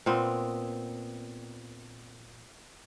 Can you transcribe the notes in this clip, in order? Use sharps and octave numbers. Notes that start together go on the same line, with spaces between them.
A#2 B3 C4